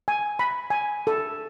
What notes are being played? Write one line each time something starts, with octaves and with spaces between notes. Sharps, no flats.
G#5
B5
G#5
A4